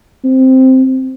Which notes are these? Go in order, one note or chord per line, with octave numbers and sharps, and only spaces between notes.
C4